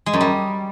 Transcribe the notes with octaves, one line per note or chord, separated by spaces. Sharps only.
G#3
F#2
G3